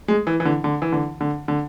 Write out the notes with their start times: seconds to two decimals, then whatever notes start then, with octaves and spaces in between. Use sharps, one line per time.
0.08 G#3
0.27 E3
0.40 E3
0.45 D3
0.64 D3
0.82 E3
0.92 D3
1.21 D3
1.48 D3